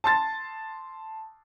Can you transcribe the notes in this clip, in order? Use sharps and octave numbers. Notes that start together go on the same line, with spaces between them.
A5 C6 A6